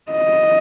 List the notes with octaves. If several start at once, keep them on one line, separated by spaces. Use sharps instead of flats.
D#5